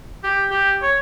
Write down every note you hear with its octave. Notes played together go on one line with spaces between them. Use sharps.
G4
G4
C#5